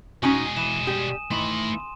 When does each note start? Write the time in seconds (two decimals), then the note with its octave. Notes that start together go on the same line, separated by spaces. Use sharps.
0.23 B2 G#3 C#4 D#4 F#4 G#5 D#6 D#7
0.56 E3 D#7 E7
0.87 G3 G4 D#6
1.31 D#3 E3 A3 B5 C6